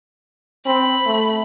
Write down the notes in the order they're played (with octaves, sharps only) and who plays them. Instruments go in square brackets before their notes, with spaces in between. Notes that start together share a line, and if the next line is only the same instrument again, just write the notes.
[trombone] C4 [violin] B5
[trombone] A3